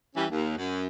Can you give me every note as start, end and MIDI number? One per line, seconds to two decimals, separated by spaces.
0.16 0.26 52
0.16 0.26 55
0.16 0.26 61
0.31 0.57 39
0.57 0.86 42